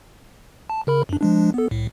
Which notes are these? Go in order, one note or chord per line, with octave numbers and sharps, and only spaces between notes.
A5
C#3 A#4 B5
F#2 D4
F3 G#3 D4
B3 A4
C2 A2